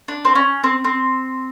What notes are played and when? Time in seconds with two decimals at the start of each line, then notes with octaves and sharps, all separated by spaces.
0.08 D4
0.25 C4
0.35 C#4
0.64 C4
0.84 C4